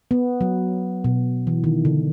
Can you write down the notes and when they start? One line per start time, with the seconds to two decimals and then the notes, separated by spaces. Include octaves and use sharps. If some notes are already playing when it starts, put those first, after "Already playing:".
0.11 B3
0.41 F#3
1.04 B2
1.47 E3
1.64 D#3
1.85 D3